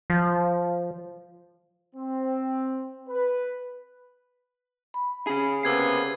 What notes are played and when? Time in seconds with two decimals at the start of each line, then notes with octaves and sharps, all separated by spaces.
0.10 F3
1.96 C4
3.09 B4
4.94 B5
5.27 C#3 G#4
5.63 C3 A#3 B3 E6 G#6 C7